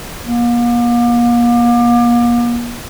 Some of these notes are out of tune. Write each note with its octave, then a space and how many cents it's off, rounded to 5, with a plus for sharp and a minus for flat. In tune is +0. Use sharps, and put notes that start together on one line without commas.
A#3 +40